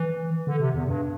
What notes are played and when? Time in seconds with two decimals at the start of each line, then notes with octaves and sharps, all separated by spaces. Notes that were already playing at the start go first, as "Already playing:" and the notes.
Already playing: E3
0.47 D3
0.60 C3
0.74 E2
0.87 G2